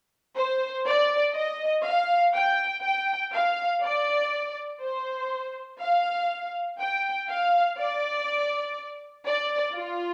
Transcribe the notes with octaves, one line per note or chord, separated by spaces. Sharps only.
C5
D5
D#5
F5
G5
G5
F5
D5
C5
F5
G5
F5
D5
D5
F4